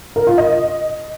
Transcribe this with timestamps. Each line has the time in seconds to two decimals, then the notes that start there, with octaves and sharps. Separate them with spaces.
0.16 A#4
0.27 F4
0.38 D#5